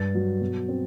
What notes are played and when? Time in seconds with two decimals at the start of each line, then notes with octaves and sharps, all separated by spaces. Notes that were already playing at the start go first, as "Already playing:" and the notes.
Already playing: G2 A6
0.15 F#3
0.41 B2
0.69 C4